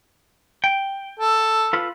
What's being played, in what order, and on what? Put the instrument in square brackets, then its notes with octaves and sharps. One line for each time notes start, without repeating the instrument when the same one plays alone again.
[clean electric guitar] G5
[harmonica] A4
[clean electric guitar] F4 A4 B4